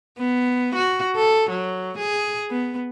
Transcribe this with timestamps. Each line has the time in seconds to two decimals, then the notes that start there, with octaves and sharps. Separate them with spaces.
0.19 B3
0.75 F#4
1.16 A4
1.50 F#3
1.98 G#4
2.50 B3